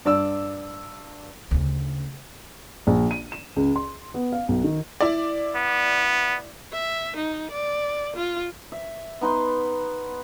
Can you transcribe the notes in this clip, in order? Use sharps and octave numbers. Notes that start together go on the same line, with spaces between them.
G2 D5 E6
D2 C#3
A#1
D#7
E7
C#2
C6
B3
F5
B1
D#3
E4 D5
B3
E5
D#4
D5
F4
E5
B3 D#4 B4 C6